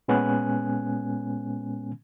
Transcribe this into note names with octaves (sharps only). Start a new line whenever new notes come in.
A#2 G#3 B3 C#4 G#5 F#6